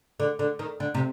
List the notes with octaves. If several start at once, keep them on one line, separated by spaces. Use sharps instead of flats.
D3
D3
D#3
D3
C3